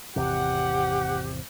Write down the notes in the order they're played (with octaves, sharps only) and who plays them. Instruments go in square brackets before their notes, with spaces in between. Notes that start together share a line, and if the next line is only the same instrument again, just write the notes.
[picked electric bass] G#1 E2 C3 [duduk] G4 [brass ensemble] F#5